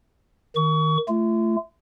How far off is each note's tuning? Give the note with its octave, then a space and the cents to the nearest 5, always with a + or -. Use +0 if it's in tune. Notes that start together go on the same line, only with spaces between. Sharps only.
D#3 +0 C#6 +30
A3 +0 F4 -35